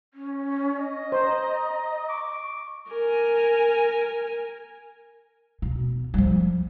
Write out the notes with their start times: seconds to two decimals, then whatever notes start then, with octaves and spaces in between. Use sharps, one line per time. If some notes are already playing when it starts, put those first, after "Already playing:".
0.14 C#4
0.79 D#5
1.12 C5 A#5
2.09 C#6 D6
2.91 A#4 G#5
5.62 B2
6.14 F3 G3